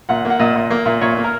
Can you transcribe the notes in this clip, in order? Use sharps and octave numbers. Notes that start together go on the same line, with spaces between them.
A#2 F#5
A#3
F#5
A#2 D#5
A#2
A#3
A#2
A#2 C#5
A#3
A#4